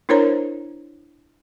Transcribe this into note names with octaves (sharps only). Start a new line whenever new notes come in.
D4 E4 A#4 C5 C#5 A#5